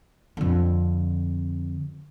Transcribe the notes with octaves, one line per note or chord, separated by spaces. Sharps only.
F2 D3